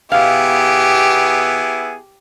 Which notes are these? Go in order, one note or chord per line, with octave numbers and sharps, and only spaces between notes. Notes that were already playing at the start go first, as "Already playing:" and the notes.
B2 B3 E4 G4 G#4 F5